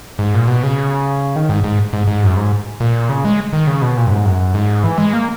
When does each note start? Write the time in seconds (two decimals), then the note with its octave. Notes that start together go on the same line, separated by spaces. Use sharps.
0.19 G#2
0.34 A#2
0.48 B2
0.63 C#3
1.36 D#3
1.49 G#2
1.64 G#2
1.93 G#2
2.07 G#2
2.23 F#2
2.37 G#2
2.80 A#2
3.09 C#3
3.25 G#3
3.53 D#3
3.67 C#3
3.82 B2
3.97 A#2
4.06 F#2
4.11 G#2
4.25 F#2
4.54 G#2
4.84 E3
4.98 G#3
5.13 A#3